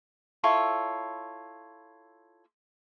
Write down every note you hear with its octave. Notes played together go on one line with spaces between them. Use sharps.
E4 F4 A4 C#5